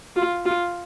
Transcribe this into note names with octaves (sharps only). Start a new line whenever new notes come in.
F4
F4